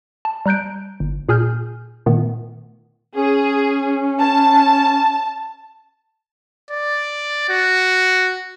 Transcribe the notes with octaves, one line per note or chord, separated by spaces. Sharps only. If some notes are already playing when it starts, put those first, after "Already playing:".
A5
G3 A#5 F#6 G6 D7
G1
A#2 G#4 G#5 F6 G6
A#2 D#3 A3 B3
C#4 G#4
A5
D5
F#4